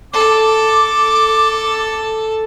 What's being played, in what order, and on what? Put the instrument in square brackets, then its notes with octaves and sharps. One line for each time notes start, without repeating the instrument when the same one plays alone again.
[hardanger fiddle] A4 [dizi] D6